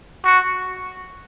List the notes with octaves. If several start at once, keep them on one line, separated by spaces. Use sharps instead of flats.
F#4